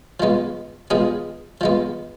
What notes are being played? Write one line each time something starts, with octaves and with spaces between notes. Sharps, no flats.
F3 G#3 B3
F3 G#3 B3 G#4
F3 G#3 B3